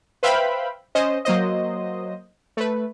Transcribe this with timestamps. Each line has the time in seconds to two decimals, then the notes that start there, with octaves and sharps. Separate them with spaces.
0.23 B4 C5 E5 F5 G5 B5
0.95 C#4 C5 D#5
1.25 F#3 A#3 C5 D#5
2.57 A3 B4